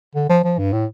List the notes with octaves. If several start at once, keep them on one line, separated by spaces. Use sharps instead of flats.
D3
F3
F3
G2
A2